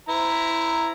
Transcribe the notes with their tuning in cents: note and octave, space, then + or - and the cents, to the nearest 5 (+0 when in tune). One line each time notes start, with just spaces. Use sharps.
E4 +5 C5 -25 A#5 +0